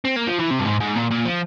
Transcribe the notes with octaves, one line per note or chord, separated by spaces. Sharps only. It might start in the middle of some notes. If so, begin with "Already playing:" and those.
C4
A#3
F3
E3
C3
G2
G#2
G#2
A#2
A#2
F3